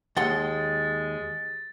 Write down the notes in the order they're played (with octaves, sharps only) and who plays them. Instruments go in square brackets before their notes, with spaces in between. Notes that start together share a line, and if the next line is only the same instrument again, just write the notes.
[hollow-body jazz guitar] D#2 F#5 C6 [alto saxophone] G#3 [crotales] A6